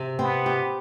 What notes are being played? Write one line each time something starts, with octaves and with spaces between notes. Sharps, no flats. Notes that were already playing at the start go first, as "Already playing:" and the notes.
Already playing: C3
B3 C4
G4